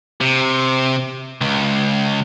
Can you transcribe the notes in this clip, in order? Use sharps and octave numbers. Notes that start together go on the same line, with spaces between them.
C3
C#2